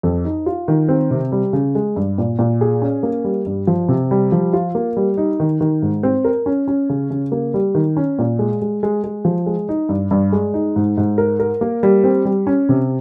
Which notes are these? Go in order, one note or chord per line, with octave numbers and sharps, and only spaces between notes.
F2
D#4
F4
D#3
C4
C3
G3
C#3
G#3
G2
A#2
A#2
G#4
C#4
A#3
G3
G2
F3
C3
G3
F3
F4
A#3
G3
D#4
D#3
D#3
G#2
C4
A#4
C#4
C#4
C#3
C#3
A#3
G3
D#3
C#4
A#2
G#3
G#3
G#3
G#3
F3
G#3
D#4
G2
G2
G#3
D#4
G#2
G#2
A#4
A#4
A#3
G3
C4
G3
C#4
C3